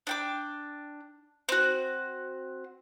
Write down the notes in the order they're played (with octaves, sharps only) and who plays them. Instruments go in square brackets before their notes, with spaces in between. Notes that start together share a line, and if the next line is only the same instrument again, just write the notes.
[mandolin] D4 G5 D6
C4 F#4